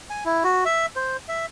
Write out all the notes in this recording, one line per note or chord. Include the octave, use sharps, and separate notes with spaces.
G#5
E4
F#4
E5
C5
E5